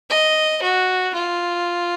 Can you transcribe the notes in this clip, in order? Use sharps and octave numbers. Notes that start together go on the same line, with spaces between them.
D#5
F#4
F4